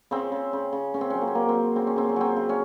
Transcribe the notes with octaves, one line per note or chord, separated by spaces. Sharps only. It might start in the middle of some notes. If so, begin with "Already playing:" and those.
C#3 C4
C#3
C#3
C#3
C#3 C#4
C4
F#3 C#4
A#3
C4
F#3 A#3
C4
F#3
C#3 C4
C#4
C#3 C4
C#4
F#3 C4
C#3
C#4